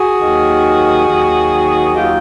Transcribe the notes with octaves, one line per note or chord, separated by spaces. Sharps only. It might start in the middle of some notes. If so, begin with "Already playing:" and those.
Already playing: F#4 G#4
D#2 D#3 F#3
D#2 D#3 F#3
D#2 D#3 F#3 F4 G4